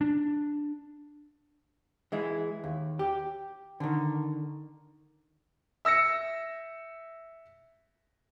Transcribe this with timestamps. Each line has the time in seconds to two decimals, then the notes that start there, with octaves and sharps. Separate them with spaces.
0.01 D4
2.12 E3 G#3 E4
2.64 D#2
2.99 G4
3.80 D3 D#3
5.85 E5 E6 A#6 C#7